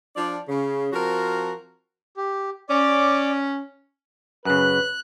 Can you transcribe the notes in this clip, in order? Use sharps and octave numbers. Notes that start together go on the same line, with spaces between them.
F3 D4 D5
C#3
F3 C4 F#4 A#4
G4
C#4 D5 D6
F#2 C#3 B4 F#6